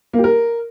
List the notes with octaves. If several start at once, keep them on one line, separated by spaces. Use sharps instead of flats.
A#3
G4
A#4